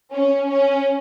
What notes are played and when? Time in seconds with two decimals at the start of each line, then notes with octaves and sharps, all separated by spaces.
0.13 C#4
0.50 C#4